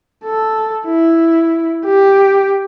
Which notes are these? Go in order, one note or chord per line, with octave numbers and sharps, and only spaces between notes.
A4
E4
G4